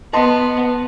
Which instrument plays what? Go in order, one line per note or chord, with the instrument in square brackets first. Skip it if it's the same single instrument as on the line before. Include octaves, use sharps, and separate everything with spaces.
[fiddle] B3 [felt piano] D#5 A5 C6